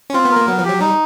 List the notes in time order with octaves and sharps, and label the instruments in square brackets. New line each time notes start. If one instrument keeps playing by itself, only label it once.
[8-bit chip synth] C#4
[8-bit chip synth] C4 [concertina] F4
[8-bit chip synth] B3
[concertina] A#4
[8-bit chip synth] A#3
[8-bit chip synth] F#3 [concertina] B3
[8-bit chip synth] F3
[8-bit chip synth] F#3 [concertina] G4
[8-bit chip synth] G3 [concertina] D#4